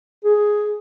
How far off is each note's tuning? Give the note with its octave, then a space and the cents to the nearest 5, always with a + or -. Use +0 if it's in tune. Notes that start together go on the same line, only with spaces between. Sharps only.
G#4 +5